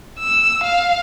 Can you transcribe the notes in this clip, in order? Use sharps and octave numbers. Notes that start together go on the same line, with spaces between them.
E6
F5